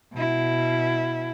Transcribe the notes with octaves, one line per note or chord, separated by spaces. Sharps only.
B2 E4